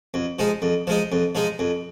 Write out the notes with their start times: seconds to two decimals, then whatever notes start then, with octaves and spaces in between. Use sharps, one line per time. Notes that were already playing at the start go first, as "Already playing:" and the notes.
0.14 F2
0.39 F3 G#3 D#4
0.62 F2
0.87 F3 G#3 D#4
1.12 F2
1.35 F3 G#3 D#4
1.59 F2